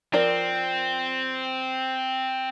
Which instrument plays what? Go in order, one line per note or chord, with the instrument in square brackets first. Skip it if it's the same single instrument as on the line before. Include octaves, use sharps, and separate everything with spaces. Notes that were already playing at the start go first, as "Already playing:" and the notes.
[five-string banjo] F3 A#4 D5 [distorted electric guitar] C4